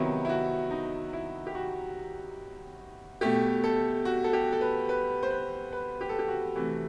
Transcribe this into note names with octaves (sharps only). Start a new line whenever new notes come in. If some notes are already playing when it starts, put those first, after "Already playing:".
Already playing: C3 D#3 F#3 B3 E4
E4
F#4
D#4
E4
G4
F#4
B2 A3 G4
A4
F#4
A4
G4
A4
B4
B4
C5
B4
B4
G4
A4
G4
F#4
C3 E3 A3